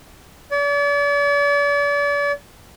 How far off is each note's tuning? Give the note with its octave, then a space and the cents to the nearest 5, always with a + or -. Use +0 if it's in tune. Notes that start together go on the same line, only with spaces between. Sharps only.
D5 -40